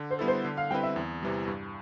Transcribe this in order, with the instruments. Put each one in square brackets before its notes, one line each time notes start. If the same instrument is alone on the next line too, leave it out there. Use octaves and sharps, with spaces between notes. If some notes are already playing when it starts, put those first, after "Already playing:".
Already playing: [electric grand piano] D3
[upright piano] C5
[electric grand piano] G3 B3 E4 A4
[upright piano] C5
[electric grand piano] D3
[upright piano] F5
[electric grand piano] G3 C4 E4 B4 [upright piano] G5
[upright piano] E5
[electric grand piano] E2
C3 E3 G3
G2